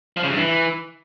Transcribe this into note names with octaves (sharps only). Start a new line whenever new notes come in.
F3
C#3
G2
E3